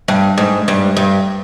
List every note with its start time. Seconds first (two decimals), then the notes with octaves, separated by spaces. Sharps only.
0.08 G2
0.38 G#2
0.68 G2
0.97 G2